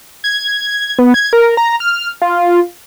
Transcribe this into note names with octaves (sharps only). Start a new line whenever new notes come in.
G#6
B3
G#6
A#4
A#5
F6
F4